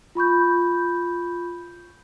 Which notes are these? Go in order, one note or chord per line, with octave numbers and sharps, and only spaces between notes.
F4 B5 C#6 G6